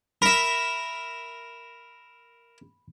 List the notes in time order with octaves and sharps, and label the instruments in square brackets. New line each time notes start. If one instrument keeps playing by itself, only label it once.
[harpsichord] A#4 E5 [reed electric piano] B5